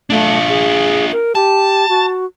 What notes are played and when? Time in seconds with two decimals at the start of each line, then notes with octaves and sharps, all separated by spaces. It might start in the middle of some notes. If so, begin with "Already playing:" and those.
0.10 A3 D4 F4
0.49 G#4
1.12 A#4
1.35 G4 A5
1.89 F#4